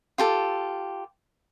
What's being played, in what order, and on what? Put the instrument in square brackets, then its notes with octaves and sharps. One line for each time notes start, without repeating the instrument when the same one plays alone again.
[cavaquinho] F4 G4 A4